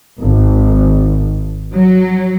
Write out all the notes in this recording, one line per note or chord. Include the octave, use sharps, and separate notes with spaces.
G#1
F#3